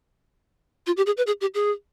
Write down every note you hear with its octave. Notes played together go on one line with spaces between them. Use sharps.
F4
G4
G#4
B4
G#4
G4
G#4